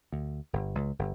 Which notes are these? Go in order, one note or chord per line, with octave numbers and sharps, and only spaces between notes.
D2
G1
C#2
G1